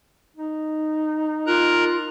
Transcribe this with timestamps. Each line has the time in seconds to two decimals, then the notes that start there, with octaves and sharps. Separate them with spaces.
0.37 D#4
1.47 F4 A#4 A#5 F#6